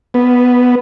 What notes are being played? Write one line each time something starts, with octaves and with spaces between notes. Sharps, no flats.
B3